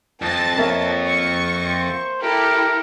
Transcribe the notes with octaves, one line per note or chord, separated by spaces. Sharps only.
F2 A5 A6
A#3 C#5 E5
C#6
C5
E4 G4 A4 A#4